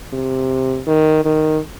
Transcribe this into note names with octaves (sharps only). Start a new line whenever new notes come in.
C3
D#3
D#3